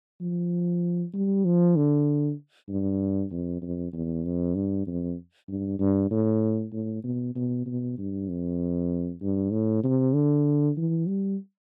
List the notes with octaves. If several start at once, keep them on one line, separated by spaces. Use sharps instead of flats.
F3
G3
F3
D3
G2
F2
F2
E2
F2
G2
F2
G2
G2
A2
A2
B2
B2
B2
G2
F2
G2
A2
C3
D3
E3
G3